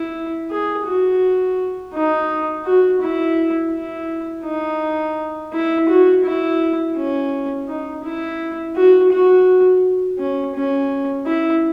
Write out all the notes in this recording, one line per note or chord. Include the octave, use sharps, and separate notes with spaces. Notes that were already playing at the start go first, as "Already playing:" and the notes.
Already playing: E4
G#4
F#4
D#4
F#4
E4
E4
D#4
E4
F#4
E4
C#4
D#4
E4
F#4
F#4
C#4
C#4
E4